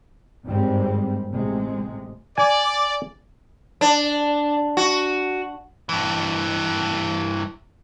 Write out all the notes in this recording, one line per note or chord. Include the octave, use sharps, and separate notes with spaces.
G#1 G2 G3 G#3 C4
A1 C3 G#3
D5 G#5
D4
F#4
G2 E3